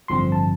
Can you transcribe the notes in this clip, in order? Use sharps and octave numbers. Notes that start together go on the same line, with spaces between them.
A1 G2 D3 F3 C4 C6
A5